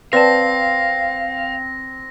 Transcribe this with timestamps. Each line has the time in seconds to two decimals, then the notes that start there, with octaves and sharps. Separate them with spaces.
0.13 C4 B4 D5 F5 A5 A#6